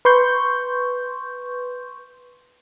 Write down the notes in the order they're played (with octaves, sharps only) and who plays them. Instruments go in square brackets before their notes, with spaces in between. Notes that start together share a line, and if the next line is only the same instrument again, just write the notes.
[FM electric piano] B4 C6 C#6 G6